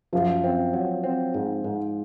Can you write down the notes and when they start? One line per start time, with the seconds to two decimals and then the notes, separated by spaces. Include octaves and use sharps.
0.13 F#2 F3
0.44 C4
0.74 F#3
1.03 C4
1.34 G#2
1.64 G#2